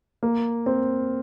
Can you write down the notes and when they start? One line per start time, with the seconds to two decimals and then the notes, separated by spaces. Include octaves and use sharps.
0.23 A#3
0.66 C4